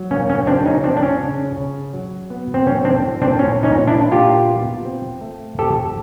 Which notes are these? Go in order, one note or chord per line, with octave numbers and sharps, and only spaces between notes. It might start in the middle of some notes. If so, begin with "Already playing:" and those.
Already playing: F#3
A#3 C#4
C#4
C#3 C4 D4
C#4 D#4
F3 C4 D4
D4
C#4
C#3
C#3
F#3
B3
C4
F#3 C#4
C4 D4
A2
C4 D4
A#2 C#4
C#4 D#4
A#2
D4 E4
A#2 F4 G4
B3
C4
A3
C4 G4 A4